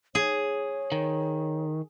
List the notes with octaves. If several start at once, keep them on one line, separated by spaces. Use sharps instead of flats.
G#4 C#5
D#3